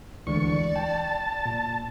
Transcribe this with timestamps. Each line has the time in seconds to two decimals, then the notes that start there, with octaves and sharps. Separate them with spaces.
0.27 D2 E3 G#3 D5 C#6
0.76 G5 A5
1.46 A#2